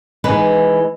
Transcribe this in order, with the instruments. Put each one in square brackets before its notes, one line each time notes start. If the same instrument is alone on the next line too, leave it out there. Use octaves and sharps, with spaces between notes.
[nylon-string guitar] E3 G#3 D#4 B4